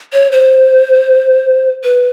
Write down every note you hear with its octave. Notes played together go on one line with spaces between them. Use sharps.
C#5
C5
B4